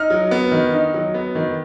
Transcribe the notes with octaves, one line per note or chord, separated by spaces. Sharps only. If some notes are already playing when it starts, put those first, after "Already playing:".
Already playing: D#4 F6
F#3
B3
D#3
D#4
F#3
B3
D#3